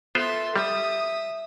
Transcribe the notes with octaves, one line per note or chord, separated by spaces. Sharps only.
B3 F4 A4 C5 E5 C6
G3 E5 D#6